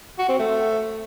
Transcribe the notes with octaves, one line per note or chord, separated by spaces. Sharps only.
F#4
C4
A3